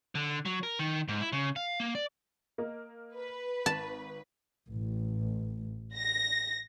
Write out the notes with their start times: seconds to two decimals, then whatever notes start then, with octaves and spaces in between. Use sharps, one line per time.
0.15 D3
0.45 F#3
0.63 A#4
0.79 D#3
1.08 G#2
1.21 E4
1.32 C#3
1.56 F5
1.80 A#3
1.95 D5
2.58 A#3 A#4 D#5
3.15 B4
3.66 G#1 A5
4.73 A1
5.95 A#6